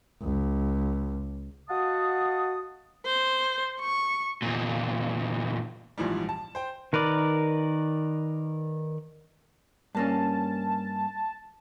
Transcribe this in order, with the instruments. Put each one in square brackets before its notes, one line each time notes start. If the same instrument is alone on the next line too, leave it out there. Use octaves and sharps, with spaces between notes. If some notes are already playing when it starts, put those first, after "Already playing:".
[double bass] C#2
[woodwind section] F#4 D#5 F5 F#5 A5 D#6
[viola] C5
C#6
[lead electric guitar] E2 A#2
[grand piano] A#1 G#2 E3 F3 G3
A5
C5 G5
[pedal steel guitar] D#3 A#4 B4 D5
[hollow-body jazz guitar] G2 A#3 C#4 [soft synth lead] A5